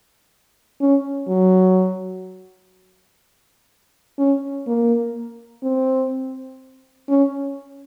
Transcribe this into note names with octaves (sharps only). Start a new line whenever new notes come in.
C#4
F#3
C#4
A#3
C4
C#4